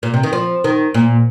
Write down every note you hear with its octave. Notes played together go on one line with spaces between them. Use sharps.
A#2
C3
D#3
F3
D#3
A#2